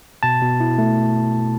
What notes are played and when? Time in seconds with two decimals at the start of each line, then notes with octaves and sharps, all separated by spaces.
0.23 B2 A5
0.42 B2
0.60 E4
0.78 A3